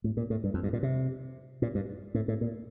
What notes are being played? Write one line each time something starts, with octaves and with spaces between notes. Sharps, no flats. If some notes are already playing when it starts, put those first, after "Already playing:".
A2
A#2
A2
G2
F2
G2
A#2
C3
A#2
G2
A2
A2
A#2